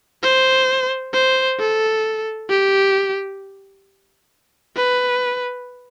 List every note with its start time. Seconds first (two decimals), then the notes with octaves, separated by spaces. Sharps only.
0.23 C5
1.13 C5
1.59 A4
2.50 G4
4.76 B4